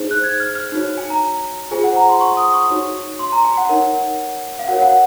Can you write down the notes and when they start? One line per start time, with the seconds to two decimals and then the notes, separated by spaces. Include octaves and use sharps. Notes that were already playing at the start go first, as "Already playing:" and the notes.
Already playing: D#4 G#4 C5
0.11 F#6
0.24 G#6
0.40 F6
0.55 F6
0.72 D#4 F#4 C#5
0.98 G#5
1.10 A#5
1.71 F4 G#4 C5 G#5
1.84 F#5
1.96 A#5
2.09 C6
2.21 C#6
2.37 D#6
2.54 C#6
2.70 D#4 F#4 C#5
3.19 C6
3.32 A#5
3.45 G#5
3.57 F#5
3.69 D#4 A#4 C#5
4.59 F5
4.68 F#4 A#4 C#5 F#5
4.82 F#5